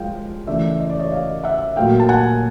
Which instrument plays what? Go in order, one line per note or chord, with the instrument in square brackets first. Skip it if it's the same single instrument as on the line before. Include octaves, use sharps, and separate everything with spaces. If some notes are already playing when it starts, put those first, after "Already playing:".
Already playing: [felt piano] F3 G#3 F5 G5
C#3 E3 A3 D5 E5
D#5
D5
C#5 D#5
D#5 F5
E5 F#5
A#2 F#3 A3 F5 G5
A5
F#5 G#5